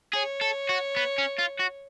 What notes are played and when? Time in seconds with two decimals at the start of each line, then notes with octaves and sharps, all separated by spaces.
0.14 G#4 C#5
0.41 A4
0.69 F#4
0.96 B3
1.18 C#4
1.38 F4
1.59 F#4